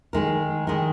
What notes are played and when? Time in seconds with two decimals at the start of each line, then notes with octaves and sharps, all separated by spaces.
0.13 D#3 G#3 D#4 A#4
0.67 D#3 G#3 D#4 A#4